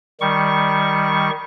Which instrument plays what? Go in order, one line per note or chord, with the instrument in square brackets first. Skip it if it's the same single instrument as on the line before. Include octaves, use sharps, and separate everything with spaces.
[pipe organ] D#3 G3 C#6